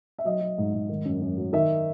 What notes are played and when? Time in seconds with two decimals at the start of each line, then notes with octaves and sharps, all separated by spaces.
0.18 E5
0.25 F#3 D#5
0.41 F#3
0.58 G#2
0.74 G#2
0.89 D#3
1.05 F#2
1.21 F#2
1.38 F#3
1.53 D#3 E5